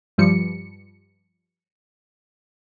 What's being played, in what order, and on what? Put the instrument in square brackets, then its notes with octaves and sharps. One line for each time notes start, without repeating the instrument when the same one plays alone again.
[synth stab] G2 F3 G3 C#7